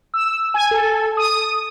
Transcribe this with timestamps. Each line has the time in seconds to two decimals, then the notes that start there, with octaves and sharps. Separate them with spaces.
0.14 E6
0.54 G#5
0.71 A4
1.17 D#6